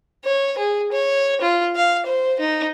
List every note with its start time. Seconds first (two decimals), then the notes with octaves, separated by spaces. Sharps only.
0.24 C#5
0.58 G#4
0.92 C#5
1.41 F4
1.76 F5
2.06 C5
2.40 D#4